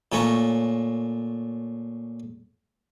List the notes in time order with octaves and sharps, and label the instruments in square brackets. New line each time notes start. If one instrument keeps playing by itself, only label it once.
[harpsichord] A#2 A3 C#4 C#5 A#5 C#6